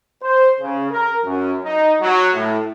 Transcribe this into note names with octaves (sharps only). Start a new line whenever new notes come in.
C5
C#3
A#4
F#2
D#4
F#3
A2